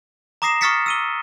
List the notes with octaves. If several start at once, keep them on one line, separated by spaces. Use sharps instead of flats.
A#5 D6 D#6 A#6 C7 E7
C#6 D#6 F6 A6 B6 C#7
E6 D#7 G7